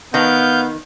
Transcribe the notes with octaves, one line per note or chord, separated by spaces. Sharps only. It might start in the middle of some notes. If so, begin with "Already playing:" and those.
D#3 B3 F5 G6